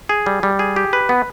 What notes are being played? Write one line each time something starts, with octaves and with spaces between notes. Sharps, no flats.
G#4
G3
G3
G#4
G4
B4
B3